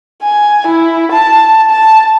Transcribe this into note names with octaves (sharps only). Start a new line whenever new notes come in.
G#5
E4
A5
A5